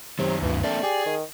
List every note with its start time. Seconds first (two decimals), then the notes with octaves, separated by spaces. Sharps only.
0.19 F#2 C3 D#3 F#3
0.42 D2 G2 E3
0.64 A3 A#3 C4 D4 D5
0.83 G4 G#4
1.06 D#3